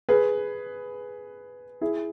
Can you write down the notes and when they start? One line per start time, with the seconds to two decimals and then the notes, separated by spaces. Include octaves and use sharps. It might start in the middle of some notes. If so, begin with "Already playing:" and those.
0.09 G#4 B4
1.81 E4 G#4